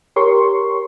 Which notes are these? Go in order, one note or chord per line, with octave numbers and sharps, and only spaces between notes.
G4 A#4 C#5 C6 C#6